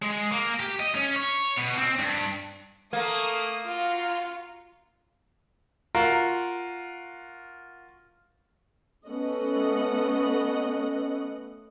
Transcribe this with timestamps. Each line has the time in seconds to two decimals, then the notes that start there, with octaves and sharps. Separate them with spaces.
0.02 G#3
0.31 A#3
0.60 G4
0.80 D#5
0.95 C#4
1.16 C#5
1.58 B2
1.78 C4
1.99 G2
2.93 A3 A#3 D#6
3.65 F4 F#4 F5
5.95 F4 F#4 A#4
9.07 A3 B3 C#4 D#5 F#5